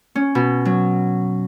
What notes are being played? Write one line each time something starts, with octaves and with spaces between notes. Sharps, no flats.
C#4
B2
F#3